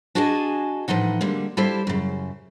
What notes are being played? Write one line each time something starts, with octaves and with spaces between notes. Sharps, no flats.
D4 F#4 G#4 D#5 G#5 A5
A2 E3 F3 D#4 F#5
D3 G3 G#3 A#3
G3 E4 G4 A4 C5 F5
F#2 C#3